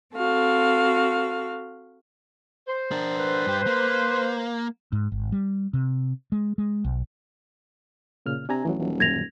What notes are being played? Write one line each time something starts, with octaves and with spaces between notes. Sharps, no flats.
C4 F#4 A4 F5
C5
D4 A#4
B4
G2 G4
A#3
G#2
G#1
G3
C3
G#3
G#3
B1
A#2 C#3 F6
C3 D4 G#5 A#5
A1 E3 F#3
D#1
F#2 A#2 D#3 G#6 A#6 F7